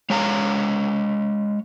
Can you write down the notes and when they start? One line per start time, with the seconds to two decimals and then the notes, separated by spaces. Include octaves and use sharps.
0.10 G#3 C#5 F5 A#5